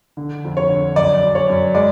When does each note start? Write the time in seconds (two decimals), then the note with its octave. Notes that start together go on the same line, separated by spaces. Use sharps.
0.17 D3
0.44 F2
0.57 C#5
0.69 D3
0.96 F#2 D5
1.23 F#2
1.35 C#5
1.49 F#2
1.75 G#3 D5